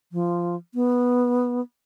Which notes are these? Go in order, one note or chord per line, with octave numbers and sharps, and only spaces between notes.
F3
B3